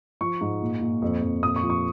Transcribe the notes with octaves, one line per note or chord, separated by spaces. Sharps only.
F3 C#6
G#2
A#2
A#2
F2
F2
A#2 D#6
C#6
F3
C#6